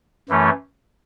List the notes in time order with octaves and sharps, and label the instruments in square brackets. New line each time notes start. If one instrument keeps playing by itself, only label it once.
[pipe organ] F#2 E3 A3 C#4